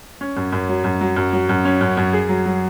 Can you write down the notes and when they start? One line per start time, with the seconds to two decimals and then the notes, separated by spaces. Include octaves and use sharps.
0.21 C#4
0.37 F#2
0.53 F#2
0.69 F#3
0.84 F#2
1.01 F#3
1.16 F#2
1.33 F#3
1.49 F#2
1.65 C#4
1.81 F#2
1.97 F#2
2.13 G#4
2.29 F#3
2.46 F#3